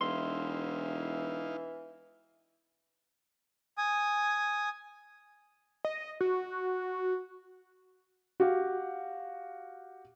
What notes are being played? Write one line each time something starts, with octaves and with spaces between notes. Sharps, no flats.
E1 E3 D#4 E4 F5 C6
G#5 D#6
D#5
F#4
F#4 G4 F5